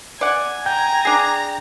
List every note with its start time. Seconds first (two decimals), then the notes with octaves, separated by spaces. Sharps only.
0.21 D5 F#5 G#5
0.66 G5 A#5 G6
1.05 D4 G#4